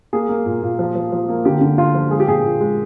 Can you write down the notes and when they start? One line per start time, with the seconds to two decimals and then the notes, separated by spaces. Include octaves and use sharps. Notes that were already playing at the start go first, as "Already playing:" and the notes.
0.13 A#3 G#4
0.29 A#3
0.46 A#2
0.62 A#2
0.79 F3
0.95 F3
1.12 F3
1.29 A#3
1.45 D3 G4
1.61 D3
1.78 D3 F4
1.95 F3
2.11 G#3 G#4
2.20 G4
2.27 A#2 G#4
2.44 A#2
2.61 G#3